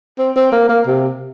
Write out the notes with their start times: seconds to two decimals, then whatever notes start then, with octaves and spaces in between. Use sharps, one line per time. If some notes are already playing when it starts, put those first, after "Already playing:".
0.19 C4
0.36 C4
0.52 A#3
0.69 A#3
0.87 C3